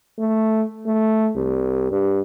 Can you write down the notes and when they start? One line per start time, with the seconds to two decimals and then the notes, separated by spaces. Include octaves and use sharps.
0.19 A3
0.86 A3
1.36 C2
1.91 G2